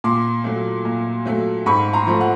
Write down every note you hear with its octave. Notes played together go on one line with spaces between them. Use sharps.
A#2 C6 D6
F#3 A3
A#2
F#3 A3
G#2 B5 C#6
A#5 C6
F3 A3
F#5